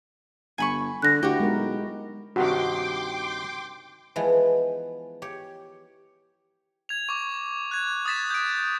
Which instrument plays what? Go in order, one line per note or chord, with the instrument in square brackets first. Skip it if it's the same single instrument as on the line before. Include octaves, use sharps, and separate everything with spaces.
[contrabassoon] G1 [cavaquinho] G#5 B5 C#6
[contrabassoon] D3 [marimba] F#6 A#6
[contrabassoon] D2 [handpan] E4 [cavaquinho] F#4 G4
[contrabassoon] B1 [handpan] G#3 A#4
[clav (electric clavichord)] G2 C3 D#3 [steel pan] F#4 [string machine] G5 C6 D6
[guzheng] E3 F3 G#3 B3
G4 C#5
[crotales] G#6 F7
C#6 D6
F#6 G#6
D#6 G#6 A6 B6 E7
G6 D7